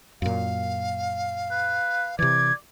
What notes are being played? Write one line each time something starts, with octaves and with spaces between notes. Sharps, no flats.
F#2 A#2 F5
B4
C3 E3 D5 G#6